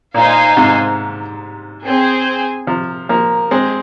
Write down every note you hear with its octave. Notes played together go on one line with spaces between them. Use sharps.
A#2 D#4 C5 F5 G#5
G#2 C3
C4 G#4 C5 G#5
C3 F3
F3 A#3
G#3 C4